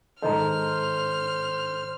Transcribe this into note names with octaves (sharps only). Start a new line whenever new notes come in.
G#2 D#3 A4 C5 D#5 A#5 F6